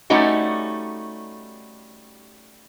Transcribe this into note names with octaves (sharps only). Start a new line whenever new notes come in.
G3 A3 C#4 D#4 F#4